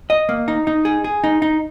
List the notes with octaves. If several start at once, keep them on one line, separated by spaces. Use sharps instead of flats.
D#5
A#3
D#4
D#4
G#4
G#4
D#4
D#4